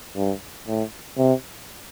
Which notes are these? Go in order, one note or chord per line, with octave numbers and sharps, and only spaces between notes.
G2
A2
C3